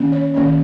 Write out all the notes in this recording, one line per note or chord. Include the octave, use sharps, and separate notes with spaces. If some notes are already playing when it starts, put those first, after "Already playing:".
Already playing: D#3 A#3 C#4
C#5
D#3 A#3 C#4